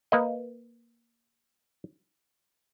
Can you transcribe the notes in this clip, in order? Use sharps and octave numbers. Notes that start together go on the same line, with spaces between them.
A#3 B4 D#5